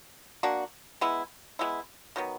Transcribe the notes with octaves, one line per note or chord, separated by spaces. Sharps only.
A#3 D4 F#4
G#3 B3 E4
G#3 B3 E4
D#3 F#3 B3